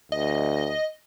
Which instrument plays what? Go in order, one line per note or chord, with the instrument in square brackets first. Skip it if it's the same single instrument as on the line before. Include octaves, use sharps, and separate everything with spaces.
[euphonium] D2 [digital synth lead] D#5